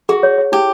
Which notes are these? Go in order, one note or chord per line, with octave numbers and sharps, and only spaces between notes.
F#4 G#4
C#5
C#5
E4 G4